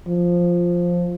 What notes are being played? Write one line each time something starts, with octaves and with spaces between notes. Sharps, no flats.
F3